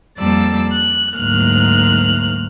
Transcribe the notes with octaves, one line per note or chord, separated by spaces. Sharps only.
F2 G3 A#3 D5 A5 E6
F#6
D2 G#2 F#3 A#3 F6 F#6